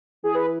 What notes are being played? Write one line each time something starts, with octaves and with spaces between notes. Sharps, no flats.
E3 G#4
B4